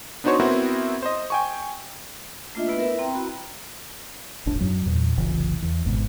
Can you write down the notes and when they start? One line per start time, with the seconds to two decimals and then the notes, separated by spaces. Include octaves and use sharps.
0.24 B3 D4 D#4 F#4 C5 C#5
0.40 B3 C4 E4 F#4 A#4 C5
1.02 C5 D#5
1.30 G5 G#5 C#6
2.55 A3 A#3 D4 F4 D#5 E5
2.66 B3 E4 B4
2.79 A#4 B4 E5
2.98 C4 E4 G5 A#5
3.13 F#4 A#5 B5
4.46 D#1 A1 A2 D4
4.60 F#2 F#3
4.86 E2 A#2
5.17 F1 B1 C#3 E3
5.62 E2
5.85 G#1 G#2 B2